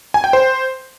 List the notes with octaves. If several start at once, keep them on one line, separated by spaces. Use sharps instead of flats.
G#5
G5
C5